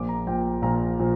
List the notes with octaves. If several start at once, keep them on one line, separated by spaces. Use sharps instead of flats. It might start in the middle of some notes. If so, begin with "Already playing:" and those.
Already playing: A#1 A#2 F3 D6
A#5
A#1 A#2 F3 G5
A#1 A#2 F3 A#5
A#2 F3